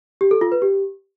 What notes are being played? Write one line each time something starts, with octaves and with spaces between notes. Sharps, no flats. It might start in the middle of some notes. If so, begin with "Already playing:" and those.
G4
A4
F4
B4
G4